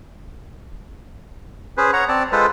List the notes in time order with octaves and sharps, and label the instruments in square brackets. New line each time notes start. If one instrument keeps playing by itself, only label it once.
[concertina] C#4 G#4 B4 C5
C#5 F#5 A#5
C4 D5 A5
G#3 F4 A4 B4 C5